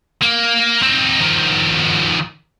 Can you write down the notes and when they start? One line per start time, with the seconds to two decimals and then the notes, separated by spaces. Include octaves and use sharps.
0.22 A#3
0.83 C4 D#4
1.20 D#3 F3